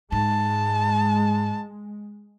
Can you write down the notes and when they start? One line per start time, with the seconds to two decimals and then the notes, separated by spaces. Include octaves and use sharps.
0.12 G#2 G#3 A5